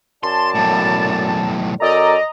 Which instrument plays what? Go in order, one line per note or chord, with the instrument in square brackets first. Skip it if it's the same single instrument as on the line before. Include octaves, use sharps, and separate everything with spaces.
[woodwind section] F#2 D5 A5 [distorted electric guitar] C6
[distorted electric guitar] B1 A2
[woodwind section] F#2 A4 D5 [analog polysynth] D#5 A#5